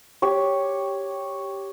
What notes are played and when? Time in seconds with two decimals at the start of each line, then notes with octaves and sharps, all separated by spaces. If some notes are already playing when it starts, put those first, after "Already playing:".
0.22 G4 C#5